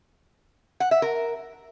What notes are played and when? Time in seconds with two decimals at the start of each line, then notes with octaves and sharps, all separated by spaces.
0.80 F#5
0.91 E5
1.02 A#4